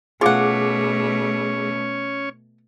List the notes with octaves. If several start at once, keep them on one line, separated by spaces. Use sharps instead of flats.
B2 A3 C#4 F4 G#4 C#5 F#5 D6